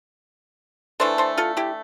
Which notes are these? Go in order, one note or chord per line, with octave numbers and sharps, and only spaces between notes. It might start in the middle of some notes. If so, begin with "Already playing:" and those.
E3 A3 D4 A4 C5
A4 C5
F4 A4
E4 G4